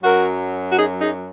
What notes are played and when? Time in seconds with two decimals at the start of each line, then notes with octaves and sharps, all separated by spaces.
0.03 F#2 F#3 F#4 A#4
0.70 F#4
0.76 D#4 G#4
1.00 D#4 G#4